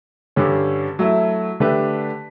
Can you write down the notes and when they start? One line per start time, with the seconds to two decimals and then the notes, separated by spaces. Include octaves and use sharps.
0.36 G2 D3 G3 C#4
0.99 F#3 A3 E4
1.60 D3 A3 D4 G4 B4